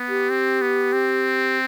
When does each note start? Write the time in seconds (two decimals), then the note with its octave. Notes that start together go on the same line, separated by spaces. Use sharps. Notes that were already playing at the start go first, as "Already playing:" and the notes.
Already playing: B3
0.09 G4
0.30 C4
0.61 B3
0.93 C4